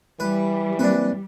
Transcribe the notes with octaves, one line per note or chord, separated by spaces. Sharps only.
E3 G3 B4
A#3 C4 D4 B4